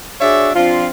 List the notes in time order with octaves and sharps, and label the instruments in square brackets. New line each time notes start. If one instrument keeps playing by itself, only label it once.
[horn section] D4 F#4 G#4 C#5 D5 E5
F3 C4 D4 F4